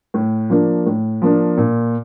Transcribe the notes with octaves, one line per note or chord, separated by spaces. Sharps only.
A2
F3 A#3 D4
A2
F3 A#3 D4
A#2